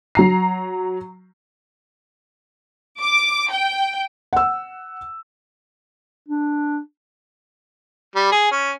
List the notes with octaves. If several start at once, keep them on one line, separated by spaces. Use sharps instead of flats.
F#3 A#5 C7
D6
G5
F#5 E6
D4
G3
G#4
C#4